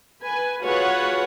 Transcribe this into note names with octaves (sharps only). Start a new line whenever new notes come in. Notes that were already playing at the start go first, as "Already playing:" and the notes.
B4 G#5
F4 F#4 G#4 B4 C#5 F#5